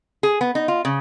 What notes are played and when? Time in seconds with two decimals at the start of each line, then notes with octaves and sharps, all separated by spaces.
0.23 G#4
0.41 B3
0.55 D#4
0.68 F4
0.85 C#3